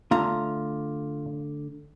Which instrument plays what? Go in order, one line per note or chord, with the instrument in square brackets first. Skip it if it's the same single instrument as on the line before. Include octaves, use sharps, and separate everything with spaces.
[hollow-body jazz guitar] D3 A3 A#5 [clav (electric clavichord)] F4